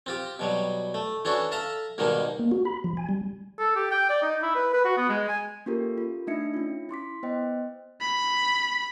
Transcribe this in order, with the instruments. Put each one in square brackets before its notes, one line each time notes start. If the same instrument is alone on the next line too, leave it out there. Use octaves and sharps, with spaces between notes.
[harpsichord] C4 F4 G4
B2 F#3 G3
A3
E3 C#4 D4 F#4 A4
A4 E5 F5 A#5
G#2 B2 D#3 G3 A#3 D#4
[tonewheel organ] A#3
F#4
B5
F3
G#5
G3
[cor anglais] A4
G4
G5
D5
D#4
E4
B4
B4
F#4
B3
G#3
G#5
[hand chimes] A#3 C#4 F4 G4 A4 A#4
F4
A3 D4 D#4 E5 C#7
C#4 F4
E4 C6 D6 B6
B3 C5 D#5 G5
[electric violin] B5